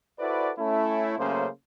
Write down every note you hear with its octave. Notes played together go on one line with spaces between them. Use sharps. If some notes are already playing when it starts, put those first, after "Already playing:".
E4 F#4 A4 B4 C5 D5
A3 C#4 E4
C#3 F#3 A3 A#3 C#4 C5